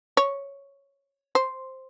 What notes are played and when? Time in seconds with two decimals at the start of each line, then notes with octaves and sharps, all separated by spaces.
0.17 C#5
1.35 C5